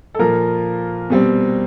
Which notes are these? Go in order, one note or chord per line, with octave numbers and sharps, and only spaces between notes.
A4
A#2 F3 A#3 A#4
B2 G3 C4